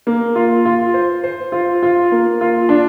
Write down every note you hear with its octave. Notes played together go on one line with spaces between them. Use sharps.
A#3
F4
F4
C5
C5
F4
F4
A#3
F4
D4